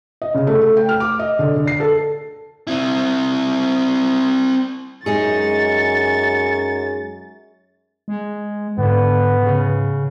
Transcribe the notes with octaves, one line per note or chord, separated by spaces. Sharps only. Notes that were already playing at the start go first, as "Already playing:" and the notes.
D#5
C#3
A3
A3
G5
F6
D6
D#5
D3
D3
C7
A4
C4 E4
F#2 G#3 D#4 G#4 C#6 A6
G#3
G#2 D3 B3
C#3